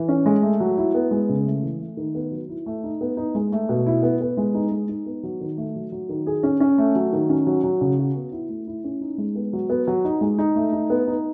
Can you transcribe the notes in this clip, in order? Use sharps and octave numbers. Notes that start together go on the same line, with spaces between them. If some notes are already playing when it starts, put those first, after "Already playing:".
Already playing: E3
C#4
G#3
A3
F#3
E4
B3
G#3
C#3
A3
E3
A3
D#3
B3
F#3
E4
A3
D#4
B3
D#4
G#3
A3
B2
E4
B3
B3
G#3
D#4
G#3
D#4
B3
F#3
D#3
A3
F#3
F#3
D#3
G#4
C#4
C#4
A3
F#3
D#3
C#4
F#3
F#3
C#3
F#4
B3
E4
A3
E4
C#4
D#4
G#3
B3
F#3
B3
F#3
D#4
G#3
D#4
A3
D#4
B3
D#4